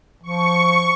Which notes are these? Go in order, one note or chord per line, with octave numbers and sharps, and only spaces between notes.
F3 C#6